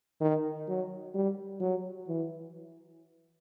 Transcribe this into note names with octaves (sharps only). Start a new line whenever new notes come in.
D#3
F#3
G3
F#3
E3